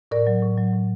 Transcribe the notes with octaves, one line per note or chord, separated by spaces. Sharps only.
A2 A#4 D5
F#3
A2
F#3
A2